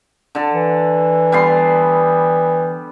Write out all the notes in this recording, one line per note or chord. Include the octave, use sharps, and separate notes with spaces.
D3 A4
E3
G3 B3 C6